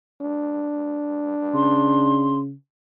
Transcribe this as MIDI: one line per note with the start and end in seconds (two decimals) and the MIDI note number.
0.21 2.41 62
1.54 2.54 49
1.54 2.39 84